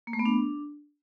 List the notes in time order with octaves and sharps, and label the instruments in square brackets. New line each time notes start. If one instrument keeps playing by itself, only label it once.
[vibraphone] A#3
A3
B3
D4